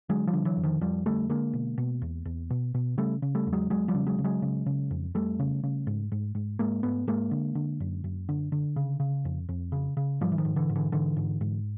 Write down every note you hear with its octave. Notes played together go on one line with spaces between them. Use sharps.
D3 F#3 G#3
F3 G3
D3
E3 F#3
F2
D#3 F3
F2 F3 G3
D3 G3 A3
D3 G#3 A#3
B2
B2
E2
E2
B2
B2
C#3 G3 A3
C#3
G3 A3
E2
F#3 G#3
E2 F#3 G#3
F3 G3
C#3
F#3 G#3
C#3
F#3 G#3
C#3
C#3
F2
F2 G3 A3
C#3
C#3
G#2
G#2
G#2
G#2 G#3 A#3
G#2 A3 B3
G#2 G#3 A#3
D3
D3
F#2
F#2
D3
D3
C#3
C#3
F2
F2
C#3
C#3
G#2 F3 G3
E3
D#3 F3
G#2
D3 E3
G#2
D3 E3
G#2 D3 E3
G#2
G#2